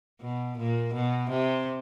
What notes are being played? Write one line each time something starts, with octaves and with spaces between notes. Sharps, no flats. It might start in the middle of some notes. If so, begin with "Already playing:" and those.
B2
A#2
B2
C3